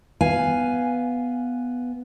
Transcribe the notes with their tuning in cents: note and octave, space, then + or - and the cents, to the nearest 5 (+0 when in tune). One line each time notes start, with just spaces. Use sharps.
B3 +0 F5 +0 G#5 +0